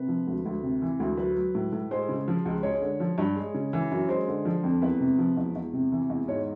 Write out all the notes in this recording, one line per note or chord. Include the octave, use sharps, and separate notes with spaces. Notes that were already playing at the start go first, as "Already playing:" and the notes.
Already playing: C3 B4
F3
D2
D2
C3
E3
D2
F#3 B4
F#3
A2
A2
G#3 C5
C#3
F3
C#2
G#3 C#5
D3
F3
G2
G#3
C#3
E3
F#2
G#3 C5
D3
F3
F2
E2 B4
C3
F3
E2
E2
C3
E3
E2
G#2 C#5